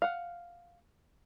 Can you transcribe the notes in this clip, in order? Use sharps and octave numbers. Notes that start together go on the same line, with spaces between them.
F5 F#5